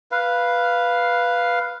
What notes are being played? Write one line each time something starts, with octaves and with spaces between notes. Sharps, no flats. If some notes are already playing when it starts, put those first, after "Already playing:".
B4 F5